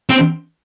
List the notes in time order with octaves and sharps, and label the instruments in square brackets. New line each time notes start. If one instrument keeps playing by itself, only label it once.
[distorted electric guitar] C4